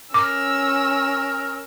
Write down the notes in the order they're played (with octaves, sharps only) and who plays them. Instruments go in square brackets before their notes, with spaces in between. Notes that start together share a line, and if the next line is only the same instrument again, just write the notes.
[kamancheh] C#4 E6 [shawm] A#4 [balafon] D6